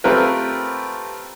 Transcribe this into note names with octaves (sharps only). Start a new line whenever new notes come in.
A3 C4 F4 G4 A#4 B4